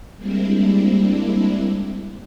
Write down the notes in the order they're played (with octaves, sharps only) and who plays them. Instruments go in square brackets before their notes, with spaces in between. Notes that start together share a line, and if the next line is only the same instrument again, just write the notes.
[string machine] G3 G#3 A#3 C4 D4 E4